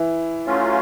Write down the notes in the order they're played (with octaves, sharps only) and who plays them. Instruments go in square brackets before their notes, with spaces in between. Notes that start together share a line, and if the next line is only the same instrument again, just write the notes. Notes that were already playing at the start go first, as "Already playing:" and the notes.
Already playing: [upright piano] E3 E4
[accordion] F#3 A3 C#4 F4